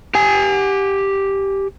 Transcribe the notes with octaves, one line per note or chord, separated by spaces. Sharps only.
G4 G#5